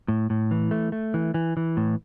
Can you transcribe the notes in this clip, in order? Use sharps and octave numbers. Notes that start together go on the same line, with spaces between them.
A2
A2
E3
A3
A3
E3
E3
E3
A2